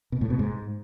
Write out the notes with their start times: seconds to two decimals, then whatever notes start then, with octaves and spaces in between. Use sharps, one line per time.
0.12 B2
0.21 A2
0.30 B2
0.39 G#2